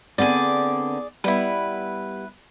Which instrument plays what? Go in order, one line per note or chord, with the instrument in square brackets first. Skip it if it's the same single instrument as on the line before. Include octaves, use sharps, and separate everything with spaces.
[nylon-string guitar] D3 B3 C4 [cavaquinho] G#4 D5
[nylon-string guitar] G3 B3 [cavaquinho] E4 B4